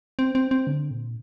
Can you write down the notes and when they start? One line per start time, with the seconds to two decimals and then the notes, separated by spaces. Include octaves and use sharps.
0.19 C4
0.35 C4
0.51 C4
0.67 D3
0.91 A#2